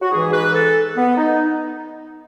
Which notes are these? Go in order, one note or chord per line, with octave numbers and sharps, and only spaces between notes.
F#4
G#2 E3 G#4
B4
A4
B3
D#4